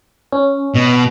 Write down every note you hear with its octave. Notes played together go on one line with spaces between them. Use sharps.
C#4
B2